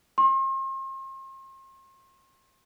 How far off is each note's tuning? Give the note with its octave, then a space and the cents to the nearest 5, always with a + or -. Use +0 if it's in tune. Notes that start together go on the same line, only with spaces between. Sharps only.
C6 +40